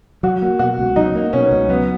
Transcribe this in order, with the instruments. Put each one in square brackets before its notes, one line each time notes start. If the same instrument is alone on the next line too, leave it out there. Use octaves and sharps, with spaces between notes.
[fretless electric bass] F#3 [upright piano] F#4
[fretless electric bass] A#3
[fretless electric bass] B2 [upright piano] F#4
[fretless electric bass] C#2
[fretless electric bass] F#3 [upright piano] D#4
[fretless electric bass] A#3
[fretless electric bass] B2 [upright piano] C#4
[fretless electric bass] C#2
[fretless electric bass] F#3 [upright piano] B3